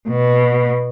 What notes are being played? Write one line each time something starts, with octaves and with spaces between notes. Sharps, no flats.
B2